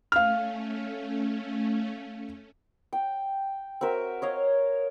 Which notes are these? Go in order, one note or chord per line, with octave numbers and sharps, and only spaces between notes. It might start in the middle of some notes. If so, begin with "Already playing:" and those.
A3 C#4 F5 F6
G5
C4 F#4 A#4 E5
C#5 D#5 F5